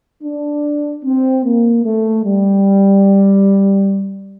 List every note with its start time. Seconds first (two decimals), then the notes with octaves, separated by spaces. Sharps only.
0.23 D4
1.04 C4
1.44 A#3
1.84 A3
2.25 G3